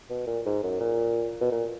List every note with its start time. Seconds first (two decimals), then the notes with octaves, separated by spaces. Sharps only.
0.10 B2
0.27 A#2
0.46 G#2
0.63 F#2
0.80 A#2
1.41 B2
1.52 A#2